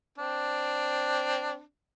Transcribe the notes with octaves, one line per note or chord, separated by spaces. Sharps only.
C4 D4